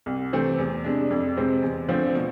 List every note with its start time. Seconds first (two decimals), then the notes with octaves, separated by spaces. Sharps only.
0.06 C2
0.33 C3 E3 A3 C4
0.58 E2
0.84 C3 G#3 D4
1.11 F2
1.37 C3 G#3 C4
1.63 E2
1.88 D3 F3 A3 C4
2.15 B2